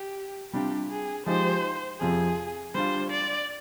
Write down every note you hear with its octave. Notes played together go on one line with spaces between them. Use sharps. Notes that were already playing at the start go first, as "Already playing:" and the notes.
Already playing: G4
C3 G3 D4 F4 G4
G#4
F3 G#3 D#4 G4 C5
F2 C3 F3 G#4
G3 D4 F4 C5
D5